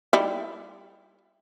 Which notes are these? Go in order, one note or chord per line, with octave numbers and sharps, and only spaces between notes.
G3 D#4 E4